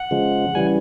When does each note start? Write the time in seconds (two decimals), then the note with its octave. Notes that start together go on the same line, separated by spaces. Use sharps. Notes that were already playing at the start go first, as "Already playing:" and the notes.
Already playing: F#5
0.11 C#3 F3 G#3
0.55 C#3 E3 G3 G#5